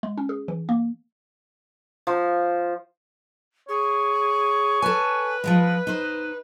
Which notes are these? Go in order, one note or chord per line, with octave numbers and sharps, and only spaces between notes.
G#3
C#4
G#4
E3
A#3
F3
G#4 C#5
A4 B4 G#5
F3 F#3 G#3
D#4 C5